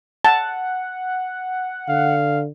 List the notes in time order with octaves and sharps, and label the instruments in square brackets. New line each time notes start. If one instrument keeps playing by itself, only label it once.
[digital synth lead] F#5 [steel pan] A5
[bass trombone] D3 [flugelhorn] F5